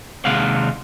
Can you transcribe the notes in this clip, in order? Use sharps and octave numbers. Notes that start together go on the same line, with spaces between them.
D#2 C3 G#3 F5 F#5